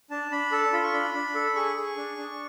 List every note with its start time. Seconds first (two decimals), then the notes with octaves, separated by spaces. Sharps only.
0.11 D4 A5
0.31 D4 B5
0.52 A4 A5
0.73 F4 B5
0.83 C#6
0.93 D4 B5
1.14 D4
1.35 A4
1.55 G#4 C#6
1.76 G#4
1.97 D4
2.17 D4